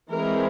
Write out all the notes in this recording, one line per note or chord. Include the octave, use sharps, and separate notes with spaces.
E3 G#3 C4 A#4